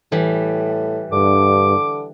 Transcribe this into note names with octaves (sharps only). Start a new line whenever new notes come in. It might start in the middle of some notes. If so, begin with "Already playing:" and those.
A2 E3 G3
G2 D3 D6